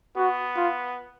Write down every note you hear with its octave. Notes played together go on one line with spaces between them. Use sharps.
B3 F#4
F4